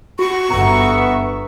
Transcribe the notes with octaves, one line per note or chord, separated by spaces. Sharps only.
F#4 C#6
G1 B3 E5 A#5